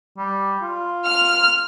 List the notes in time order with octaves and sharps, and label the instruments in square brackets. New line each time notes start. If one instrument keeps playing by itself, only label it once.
[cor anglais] G3
F4
[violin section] F6